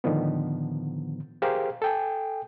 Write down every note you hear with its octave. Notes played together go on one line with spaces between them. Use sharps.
A2 D3 D#3 F3 B3
G4 G#4 A#4 C5 F5
A4 G5 G#5